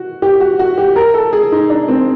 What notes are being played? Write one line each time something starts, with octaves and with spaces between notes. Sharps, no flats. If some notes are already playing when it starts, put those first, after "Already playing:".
Already playing: F#4
G4
F#4
F#4
G4
A#4
A4
G#4
D#4
D4
C4